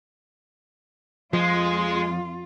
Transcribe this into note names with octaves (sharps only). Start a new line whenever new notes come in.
F2 F3 G#3 F4